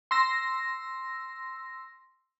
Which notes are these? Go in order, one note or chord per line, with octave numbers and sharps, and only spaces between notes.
C6 E6 A#6